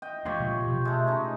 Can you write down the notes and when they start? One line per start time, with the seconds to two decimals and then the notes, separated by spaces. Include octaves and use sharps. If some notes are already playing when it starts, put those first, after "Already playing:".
0.02 D#5 G5
0.25 G#3 B3 D4 F4 G4 C#5
0.40 A#2 F3
0.67 B2
0.85 G#3 A3
1.07 C#4 D#4